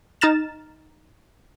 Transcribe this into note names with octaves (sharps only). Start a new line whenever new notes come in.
D#4 A#5 F6 A6 E7